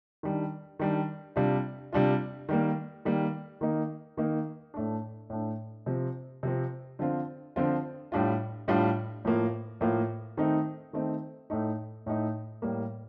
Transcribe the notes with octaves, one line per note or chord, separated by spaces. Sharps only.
D#3 G3 D4
D#3 G3 D4
C3 G3 D4 F4
C3 G3 D4 F4
D#3 G3 A#3
D#3 G3 A#3
D#3 A#3 D#4
D#3 A#3 D#4
A2 A3 D4
A2 A3 D4
C3 F3 C4
C3 F3 C4
D3 F3 C4 F4
D3 F3 C4 F4
A2 G3 D4 F4
A2 G3 D4 F4
A2 F3 A#3 F4
A2 F3 A#3 F4
D#3 A3 C4 D#4
D#3 A3 C4 D#4
A2 A3 D#4
A2 A3 D#4
A2 G3 A#3